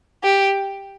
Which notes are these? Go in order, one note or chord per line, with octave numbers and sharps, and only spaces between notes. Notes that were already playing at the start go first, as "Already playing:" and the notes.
G4